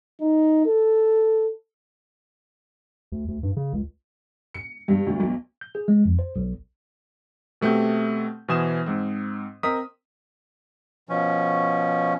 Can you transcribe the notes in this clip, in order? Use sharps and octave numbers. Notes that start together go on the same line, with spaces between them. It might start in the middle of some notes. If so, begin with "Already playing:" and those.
D#4
A4
D2
D2
G2
C#3
C#2
C#7
G2
D2
B1
G6
G#4
G#3
F2
C5
B1
B2 A3 C4 G4 G6
B2 E3 C5 G#5 D#6 E7
G#2 C4
C4 A#4 D#5 D#6 B6
B2 F3 C#4